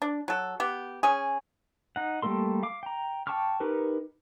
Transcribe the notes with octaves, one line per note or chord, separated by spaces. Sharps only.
D4
F#3 A4
B3 G4
C#4 G#4
D#4 F#5
G3 A3 A#3 A4 C6
F5 D6
G5 A#5
G5 A5 C#6 D6 F6
D#4 G4 A#4 B4